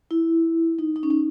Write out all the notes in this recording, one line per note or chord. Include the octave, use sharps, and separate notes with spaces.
E4
D#4
D#4
C#4
D#4